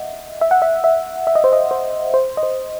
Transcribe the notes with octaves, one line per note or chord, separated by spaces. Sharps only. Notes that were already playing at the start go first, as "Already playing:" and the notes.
Already playing: D#5 E5 F#5
E5
F#5
E5
E5
E5
D#5
C5
D#5
C5
C5
D#5
C5